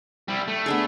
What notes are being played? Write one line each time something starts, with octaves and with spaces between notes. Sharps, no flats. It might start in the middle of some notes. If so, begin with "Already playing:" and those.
G3 E4
A3
B3 D4 G#4